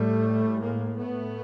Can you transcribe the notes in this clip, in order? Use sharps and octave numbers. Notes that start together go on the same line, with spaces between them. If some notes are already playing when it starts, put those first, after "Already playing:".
Already playing: A2 G3 A3
G#3 A#3
A3 B3